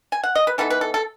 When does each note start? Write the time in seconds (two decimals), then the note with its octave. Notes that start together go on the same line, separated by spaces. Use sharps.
0.12 G#5
0.24 F#5
0.35 D#5
0.47 B4
0.58 E3 B3 D#4 A4
0.70 B4
0.81 A4
0.94 A4